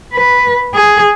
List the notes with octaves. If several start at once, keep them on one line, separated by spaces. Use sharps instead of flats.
B4
G#4